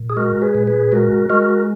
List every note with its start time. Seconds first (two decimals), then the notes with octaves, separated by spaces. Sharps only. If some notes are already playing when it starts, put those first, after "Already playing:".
Already playing: A#2
0.10 G#4
0.17 G#3 F#4 A#4
0.42 G#4 B4
0.55 A#2
0.67 G#4 B4
0.92 G#3 F#4 A#4
1.30 G#3 F#4 A#4